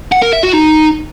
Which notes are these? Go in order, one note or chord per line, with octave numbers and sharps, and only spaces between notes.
F#5
A#4
E5
F#4
D#4